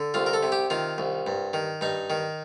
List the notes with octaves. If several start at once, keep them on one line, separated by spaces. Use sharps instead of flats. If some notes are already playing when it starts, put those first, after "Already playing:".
Already playing: D3
C2 F4
A#4
A4
C3
G4
D#3 F4
C2
G2
D#3
G2 D#4
D#3